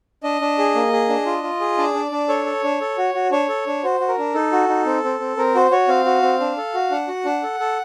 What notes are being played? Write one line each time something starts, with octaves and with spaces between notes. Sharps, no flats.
D4 D#5
D4
G#4
A#3
G#4
D4
F4
F4
G#4
D4 D5
D4
D4
A4 C#5
A4
D4
A4
F#4
F#4
D4 C#5
A4
D4
F#4 C5
F#4
A#4
D4
D#4 A4
F#4
D#4
C4
C4
C4
C4 A#4
F#4 C5
F#4 C#5
C4 F5
F#4
C4
D4
A4
F#4
D4 F#5
F#4
D4
A4
A4